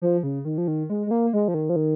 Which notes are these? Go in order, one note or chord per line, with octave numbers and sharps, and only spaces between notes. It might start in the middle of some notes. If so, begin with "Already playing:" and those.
F3
C#3
D#3
F3
D#3
G#3
G#3
A#3
G#3
F3
D#3
F3
D#3